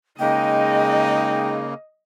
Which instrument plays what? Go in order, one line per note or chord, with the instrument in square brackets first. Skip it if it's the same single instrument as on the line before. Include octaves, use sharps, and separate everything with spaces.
[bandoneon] C#3 A#3 [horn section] G#3 D#4 [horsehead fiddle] D#5 [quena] G5